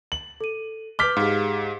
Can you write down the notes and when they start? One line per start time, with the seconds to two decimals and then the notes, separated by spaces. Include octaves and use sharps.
0.12 F#7
0.41 A4 D#7
0.99 B4 D6 F6 G6 B6 G7
1.17 G#2 G4 G#4 F5